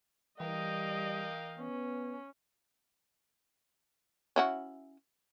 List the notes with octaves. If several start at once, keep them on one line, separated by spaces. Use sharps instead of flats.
E3 G3 A#4 D#5 F5 G5
B3 C#4
C#4 E4 F#4